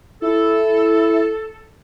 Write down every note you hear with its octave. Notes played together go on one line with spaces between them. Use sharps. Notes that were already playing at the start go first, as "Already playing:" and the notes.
E4 A4